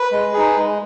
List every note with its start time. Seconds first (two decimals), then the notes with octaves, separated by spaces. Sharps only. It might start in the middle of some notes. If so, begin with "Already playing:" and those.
Already playing: B4
0.11 G#3
0.33 D#4 G#4
0.56 G#3